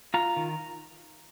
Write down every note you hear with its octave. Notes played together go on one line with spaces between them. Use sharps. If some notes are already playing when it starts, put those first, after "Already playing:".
F4 A#5
D#3